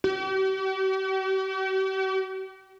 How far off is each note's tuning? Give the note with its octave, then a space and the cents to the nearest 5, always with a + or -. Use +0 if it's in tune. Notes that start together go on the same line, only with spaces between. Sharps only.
G4 -45